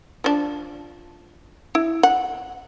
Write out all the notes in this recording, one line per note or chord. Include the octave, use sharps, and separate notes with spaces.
F3 D4
E4
F#5